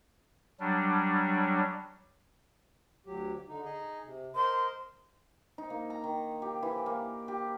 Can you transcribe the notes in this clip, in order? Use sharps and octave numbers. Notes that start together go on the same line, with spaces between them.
F#3 G3 D4
D2 F#3 G4
D3 D#4
D#4 G#4 D#5
C3
A#4 C5 D#5 C6
D#4
A#3
A#5
D#3
G4
E3
A#3
G4